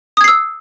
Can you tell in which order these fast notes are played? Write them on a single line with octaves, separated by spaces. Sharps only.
D#6 G#6 C7 E6